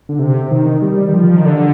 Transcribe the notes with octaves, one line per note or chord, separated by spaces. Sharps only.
D3
C3
D#3
G3
D#3
F3
D#3
D3